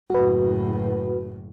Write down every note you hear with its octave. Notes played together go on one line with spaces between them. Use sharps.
F#1 A2 F#4 B4